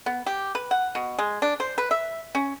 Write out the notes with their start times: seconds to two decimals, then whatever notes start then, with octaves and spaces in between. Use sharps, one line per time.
0.06 B3
0.26 G4
0.55 B4
0.71 F#5
0.95 B2
1.19 G#3
1.42 D4
1.60 C5
1.78 B4
1.91 E5
2.35 C#4